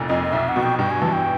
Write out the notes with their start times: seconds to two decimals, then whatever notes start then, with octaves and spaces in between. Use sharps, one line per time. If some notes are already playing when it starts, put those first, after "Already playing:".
Already playing: F1 A#2
0.09 F2 D#5
0.23 D#5
0.32 B1 E5
0.48 F#5
0.56 B2
0.63 G5
0.79 G2 G5
0.91 G#5
1.02 E3 A5
1.13 G5